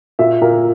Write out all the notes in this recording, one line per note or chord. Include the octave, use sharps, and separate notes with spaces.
A#2 E5
A#2 A#4